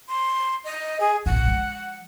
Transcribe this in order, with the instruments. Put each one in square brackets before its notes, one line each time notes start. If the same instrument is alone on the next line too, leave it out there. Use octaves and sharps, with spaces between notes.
[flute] C6
D#5
G#4
[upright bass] B1 A#2 [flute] F#5
[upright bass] F3 G#3